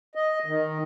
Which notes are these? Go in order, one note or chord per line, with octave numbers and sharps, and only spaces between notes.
D#5
D#3